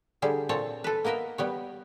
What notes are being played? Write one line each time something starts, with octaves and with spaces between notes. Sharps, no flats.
D3 G3 G#4
A#2 C4 A4 C#5 A5
A4 B4
A#3 B3 A#4 D#5 E5
G3 B3 C#5